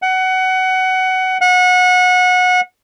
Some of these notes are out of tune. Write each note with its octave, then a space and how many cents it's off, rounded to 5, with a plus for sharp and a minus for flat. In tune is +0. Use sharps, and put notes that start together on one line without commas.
F#5 +20
F#5 -25